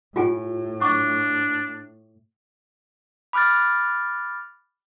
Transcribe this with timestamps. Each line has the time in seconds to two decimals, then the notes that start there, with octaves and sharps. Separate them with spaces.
0.16 A2 F4 G4 G#5
0.81 D4 C#6 D6
3.33 B5 D6 F6 F#6 A6